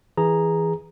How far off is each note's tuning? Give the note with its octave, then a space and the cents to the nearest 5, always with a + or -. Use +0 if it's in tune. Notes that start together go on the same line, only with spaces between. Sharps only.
E3 -10 G#4 -10 A#5 +0